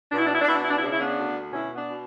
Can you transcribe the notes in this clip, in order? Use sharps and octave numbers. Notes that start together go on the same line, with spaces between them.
B2 D4
E4
D4
E4
D4
B2 E4
D4
E4
D4
E4
C#3 D4
E4
B3 D4
D2
B2 C#4 E4
B3 D4
B2